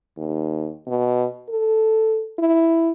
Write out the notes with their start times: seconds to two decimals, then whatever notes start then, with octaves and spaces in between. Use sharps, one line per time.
0.17 D#2
0.87 B2
1.49 A4
2.39 E4